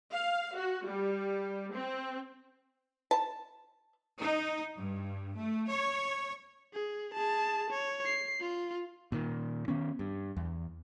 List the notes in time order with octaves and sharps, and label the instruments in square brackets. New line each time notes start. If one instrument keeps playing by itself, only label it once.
[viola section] F5
F#4
G3
C4
[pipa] A5
[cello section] D#4
G2
A3
C#5
[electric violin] G#4
G#4 A5
C#5
C7
F4
[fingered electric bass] A#2 D#3
D#3 B3 C#4
G2
E2